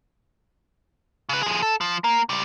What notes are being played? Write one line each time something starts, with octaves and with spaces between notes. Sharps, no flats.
C#3 B4
F3 G#4
A4
F3
A#3
C#2 G3